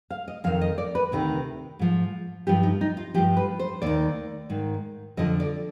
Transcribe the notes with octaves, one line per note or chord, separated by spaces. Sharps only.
F5
D#5
F2 D#3 F5
D#5
D5
B4
D2 C3 D#3
G#2 F3
G2 F3 G4
D#4
D#4
F4
G2 F3 G4
B4
C5
D#2 D#3 D5
G#2 D#3
F2 D3 F3 D#5
D5